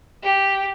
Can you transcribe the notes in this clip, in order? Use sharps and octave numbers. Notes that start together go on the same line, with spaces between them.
G4